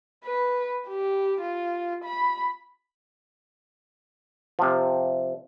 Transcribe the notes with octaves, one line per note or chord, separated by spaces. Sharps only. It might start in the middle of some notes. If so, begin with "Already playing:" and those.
B4
G4
F4
B5
C3 F3